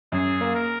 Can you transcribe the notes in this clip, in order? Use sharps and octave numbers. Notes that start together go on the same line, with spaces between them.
F#2 G#4
A#3
A#4